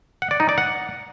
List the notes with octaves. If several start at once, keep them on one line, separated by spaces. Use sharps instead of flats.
F#5
D5
D#4
D5
F#5